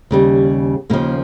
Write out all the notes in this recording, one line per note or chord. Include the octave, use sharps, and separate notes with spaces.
D#2 C#3 G3
D#2 C#3 F3 A#3